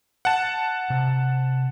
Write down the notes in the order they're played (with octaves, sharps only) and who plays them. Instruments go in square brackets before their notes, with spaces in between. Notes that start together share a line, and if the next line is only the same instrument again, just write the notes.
[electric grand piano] F#5 A5
[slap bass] C3 C4